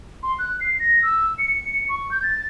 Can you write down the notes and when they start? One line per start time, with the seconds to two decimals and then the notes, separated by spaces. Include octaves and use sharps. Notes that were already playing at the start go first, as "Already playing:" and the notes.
0.23 C6
0.39 F#6
0.61 C7
0.79 A#6
1.03 E6
1.39 C#7
1.89 C#6
2.11 G6
2.23 A6